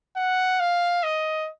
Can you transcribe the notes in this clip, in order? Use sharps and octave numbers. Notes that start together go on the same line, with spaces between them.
F#5
F5
D#5